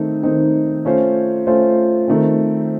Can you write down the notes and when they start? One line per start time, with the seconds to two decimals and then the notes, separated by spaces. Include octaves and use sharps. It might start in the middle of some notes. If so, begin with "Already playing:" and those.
Already playing: D#3 A3 C4 D#4
0.23 D#3 A3 C4 D#4
0.85 A3 C#4 F4 C5
1.47 A3 C#4 F4 C5
2.08 D#3 A3 C4